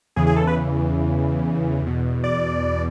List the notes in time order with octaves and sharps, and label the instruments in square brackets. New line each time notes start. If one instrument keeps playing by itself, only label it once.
[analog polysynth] E2 C#3 E3 G#4
G#4
A4
B4
E2 B2
D5